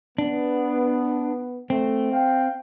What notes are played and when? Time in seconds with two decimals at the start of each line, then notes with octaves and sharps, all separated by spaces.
0.18 B3 D4
1.70 A3 C4
2.11 F5 G5